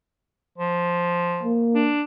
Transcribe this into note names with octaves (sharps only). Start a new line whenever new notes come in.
F3
A#3
D4